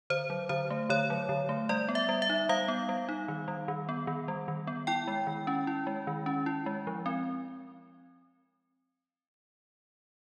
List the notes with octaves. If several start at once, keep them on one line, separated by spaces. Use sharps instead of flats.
D3 C5
F#3
D3 C5
A3
D3 C#5
F#3
D3
A3
G3 D5
B3
E5
G3
E5
D#4
G3 F5
B3
G3
D#4
D#3
G3
D#3
B3
D#3
G3
D#3
B3
E4 G5
G#3
D#3
C#4
E4
G#3
D#3
C#4
E4
G#3
F3
C4